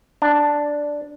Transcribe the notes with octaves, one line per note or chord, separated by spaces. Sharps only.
D4